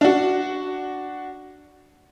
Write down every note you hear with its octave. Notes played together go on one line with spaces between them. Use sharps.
D4 F#4